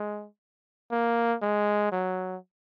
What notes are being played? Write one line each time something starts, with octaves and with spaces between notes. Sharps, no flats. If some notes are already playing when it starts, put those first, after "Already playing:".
Already playing: G#3
A#3
G#3
F#3